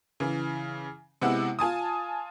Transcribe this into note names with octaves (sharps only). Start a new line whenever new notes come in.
C#3 E3
C3 G#3 B3 E4 F#5 E6
F4 G#5 A5 D#6